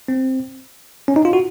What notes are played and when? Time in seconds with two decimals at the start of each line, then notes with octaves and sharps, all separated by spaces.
0.08 C4
1.08 C#4
1.16 D#4
1.25 F4
1.33 F#4